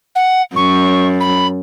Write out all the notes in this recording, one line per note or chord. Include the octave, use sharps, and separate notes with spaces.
F#5
F#2 C#6
B5